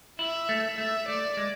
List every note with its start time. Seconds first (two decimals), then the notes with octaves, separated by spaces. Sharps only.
0.19 E4 E5
0.49 A3
0.78 A3 E5
1.08 A3 D5
1.37 G#3